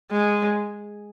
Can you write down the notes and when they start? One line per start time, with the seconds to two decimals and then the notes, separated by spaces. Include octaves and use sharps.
0.12 G#3